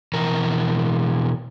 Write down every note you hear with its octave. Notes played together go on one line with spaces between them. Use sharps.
B2 E3 A#4